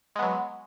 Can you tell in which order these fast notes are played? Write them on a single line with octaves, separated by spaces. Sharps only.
G#3 B3 F#3